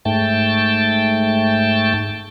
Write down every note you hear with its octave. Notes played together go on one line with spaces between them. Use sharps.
G#2 A3 G5 A5